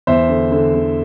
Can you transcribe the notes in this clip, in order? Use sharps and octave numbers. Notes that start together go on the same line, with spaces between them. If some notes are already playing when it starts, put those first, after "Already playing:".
E2 C5 E5
D3
D3
D3